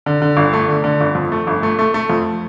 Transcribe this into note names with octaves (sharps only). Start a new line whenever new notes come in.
D3
D3
G1
A3
D3
D3
G1
F2
A3
G1
A3
A3
A3
F2